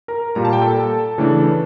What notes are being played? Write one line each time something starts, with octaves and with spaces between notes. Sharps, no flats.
A#4 A#5
A#2 G3 A#3 A#5
A5
G5
A4 A5
C#3 E3 A3 D4